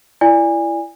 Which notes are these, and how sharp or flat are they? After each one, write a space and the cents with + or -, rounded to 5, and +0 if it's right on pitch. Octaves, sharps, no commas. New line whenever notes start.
E4 +25 D5 +0 G#5 -25